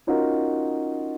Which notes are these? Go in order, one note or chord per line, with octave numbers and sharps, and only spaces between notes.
C#4 D#4 F4 F#4 A#4